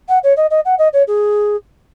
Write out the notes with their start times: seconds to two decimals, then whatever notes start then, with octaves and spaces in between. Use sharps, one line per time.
0.08 F#5
0.23 C#5
0.36 D#5
0.50 D#5
0.65 F#5
0.78 D#5
0.93 C#5
1.07 G#4